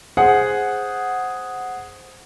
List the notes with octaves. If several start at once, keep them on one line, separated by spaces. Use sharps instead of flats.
G#4 C5 F#5